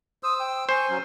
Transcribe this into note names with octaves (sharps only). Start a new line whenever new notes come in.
C5 D#6 E6
G5
C5 G#5 C#6
F#3 C#4